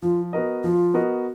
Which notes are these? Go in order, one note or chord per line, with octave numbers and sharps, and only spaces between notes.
F3 F4
B3 F#4 A#4 D#5
F3 F4
B3 F#4 A#4 D#5